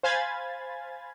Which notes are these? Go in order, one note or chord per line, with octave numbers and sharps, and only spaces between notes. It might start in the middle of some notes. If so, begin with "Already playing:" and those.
C5 F5 G#5 B5 G#6 A6